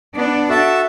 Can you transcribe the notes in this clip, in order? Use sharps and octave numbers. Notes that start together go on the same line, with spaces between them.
B3 D4
F#4 A4 E5 A5